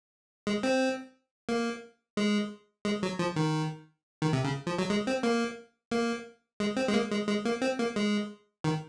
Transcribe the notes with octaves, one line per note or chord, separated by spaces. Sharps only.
G#3
C4
A#3
G#3
G#3
F#3
F3
D#3
D#3
C3
C#3
F3
F#3
G#3
C4
A#3
A#3
G#3
C4
G#3
A#3
G#3
G#3
A#3
C4
A#3
G#3
D#3